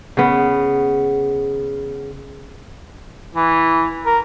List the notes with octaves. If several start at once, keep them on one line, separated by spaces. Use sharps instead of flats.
C#3 B3
E3
A#4